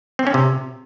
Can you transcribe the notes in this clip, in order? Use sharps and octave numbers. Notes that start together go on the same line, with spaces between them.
C4
C#4
C3